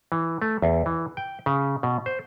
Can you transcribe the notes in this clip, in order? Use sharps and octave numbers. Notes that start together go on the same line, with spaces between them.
E3
A3
E2
E3
G5
C#3
B2
C5